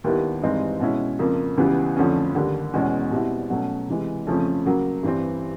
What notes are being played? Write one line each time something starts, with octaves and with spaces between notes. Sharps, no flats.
D#2 D#3 G3 B3 E4
G2 E3 G#3 C4 D#4
B2 G#3 C#4 E4
F2 C#3 F3 A#3
C#2 C#3 E3 G3 B3
F2 D3 F3 A3 C#4
D#2 D3 G3
E2 B2 G#3 C#4
B2 G3 C4 E4
B2 F#3 A3 C#4
C3 E3 G#3
F2 C#3 F3 A3 C#4
C#3 F#3 A#3
G2 E3 G3 C4